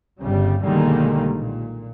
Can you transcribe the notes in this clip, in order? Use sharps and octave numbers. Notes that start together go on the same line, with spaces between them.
G1 C#3 G3
B1 D3 D#3 G3 G#3 A#3
A#2